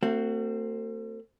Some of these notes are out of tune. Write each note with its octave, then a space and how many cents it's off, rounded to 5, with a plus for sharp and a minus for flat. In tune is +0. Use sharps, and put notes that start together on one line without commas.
A3 +45 C4 +0 F#4 +15